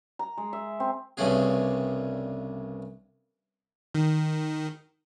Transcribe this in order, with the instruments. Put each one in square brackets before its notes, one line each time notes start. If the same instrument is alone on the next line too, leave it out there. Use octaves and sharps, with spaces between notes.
[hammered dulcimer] A#5
G#3
E5
C4
[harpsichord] C2 G2 C#3 A3 C#4 G#4
[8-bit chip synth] D#3